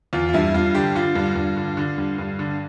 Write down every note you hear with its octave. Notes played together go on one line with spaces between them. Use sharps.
E2 F4
F4
G2 E4
G2 F4
D3 G4
D3 F4
G2
G2
D3
D3
G2
G2
D3